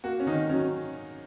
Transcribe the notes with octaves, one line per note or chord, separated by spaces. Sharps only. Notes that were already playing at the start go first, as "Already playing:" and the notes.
A#3 F#4
C#4
D#3 D#4
F#3 C#4